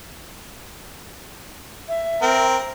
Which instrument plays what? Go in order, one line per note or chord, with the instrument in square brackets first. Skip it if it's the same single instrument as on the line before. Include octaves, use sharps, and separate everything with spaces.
[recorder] E5
[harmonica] C4 A#4